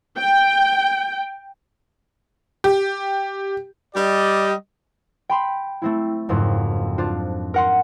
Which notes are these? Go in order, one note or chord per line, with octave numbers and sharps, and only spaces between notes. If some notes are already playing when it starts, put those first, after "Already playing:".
G5
G4
G3 G4 D5 D#5
G5 B5 C6
A3 C4 E4
F#1 F2 G#2 C4
D4 F4 C5
A#4 F#5 C6